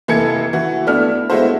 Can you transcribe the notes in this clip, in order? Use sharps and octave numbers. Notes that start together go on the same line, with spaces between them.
F1 E3 A#3 A4 G#6 C#7
E3 F#4
A3 B3 D4 E4 F6
G#3 A3 B3 E4 F#4 C5